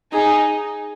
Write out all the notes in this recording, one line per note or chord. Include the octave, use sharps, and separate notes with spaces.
D#4 G#4